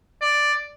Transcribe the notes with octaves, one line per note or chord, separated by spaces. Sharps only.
D5